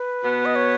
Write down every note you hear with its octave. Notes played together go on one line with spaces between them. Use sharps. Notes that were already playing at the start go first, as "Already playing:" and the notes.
Already playing: B4
B2 B3
D#5
C#5